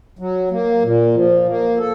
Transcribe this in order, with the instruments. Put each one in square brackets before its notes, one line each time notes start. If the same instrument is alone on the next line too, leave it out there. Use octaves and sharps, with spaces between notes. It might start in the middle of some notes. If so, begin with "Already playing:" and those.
[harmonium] F#3
A#3
A#2
F3
A#3
A4